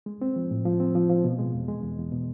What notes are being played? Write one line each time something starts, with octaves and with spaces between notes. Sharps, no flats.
G#3
C4
F3
A2
F3
C4
F3
F3
B2
G#3
E2
G#3
E2
E2
B2